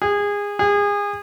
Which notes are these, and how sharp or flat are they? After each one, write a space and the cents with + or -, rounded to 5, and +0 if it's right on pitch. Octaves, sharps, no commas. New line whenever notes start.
G#4 -25
G#4 -30